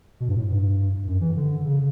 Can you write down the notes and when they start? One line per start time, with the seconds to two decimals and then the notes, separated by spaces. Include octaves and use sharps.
0.20 B2
0.29 G2
0.35 A2
0.49 G2
1.07 F#2
1.21 E3
1.36 D3
1.65 C#3